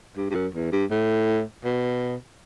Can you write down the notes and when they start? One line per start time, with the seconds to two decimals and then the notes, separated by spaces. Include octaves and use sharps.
0.16 G2
0.30 G2
0.35 F#2
0.54 E2
0.72 G2
0.91 A2
1.64 B2